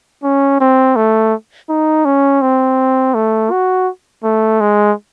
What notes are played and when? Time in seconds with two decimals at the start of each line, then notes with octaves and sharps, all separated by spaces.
0.23 C#4
0.60 C4
0.96 A3
1.69 D#4
2.05 C#4
2.42 C4
3.15 A3
3.51 F#4
4.24 A3
4.61 G#3